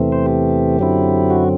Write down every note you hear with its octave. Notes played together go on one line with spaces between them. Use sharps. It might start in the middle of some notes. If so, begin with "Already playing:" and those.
Already playing: E2 C3 E3 A3 C4
C5
G4
F#2 D3 F#3 C4 E4
F#4